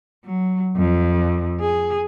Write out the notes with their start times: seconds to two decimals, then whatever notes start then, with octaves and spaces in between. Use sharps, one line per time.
0.25 F#3
0.77 F2
1.60 G#4